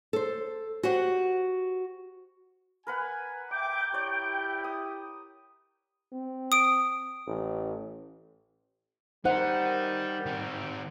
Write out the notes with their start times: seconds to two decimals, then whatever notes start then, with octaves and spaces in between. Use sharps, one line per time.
0.13 A4 C5
0.83 F#4 G4 C5 F#5
2.87 A#4 B4 F#5 G#5
3.51 E5 G5 D6
3.93 E4 G4 C#5 D5
4.64 D#6
6.12 C4
6.52 D#6 D7
7.27 A1
9.25 G3 D#4 A#4 C5 F#5
10.26 D#3 C4